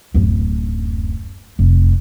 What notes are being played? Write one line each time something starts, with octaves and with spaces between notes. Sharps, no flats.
D1 F#2
F1